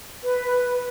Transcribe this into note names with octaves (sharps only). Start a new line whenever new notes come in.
B4
B4